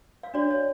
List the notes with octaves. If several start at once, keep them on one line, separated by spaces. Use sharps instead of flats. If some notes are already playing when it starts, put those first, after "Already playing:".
F5
D4 F#4 C#5 D5
C#5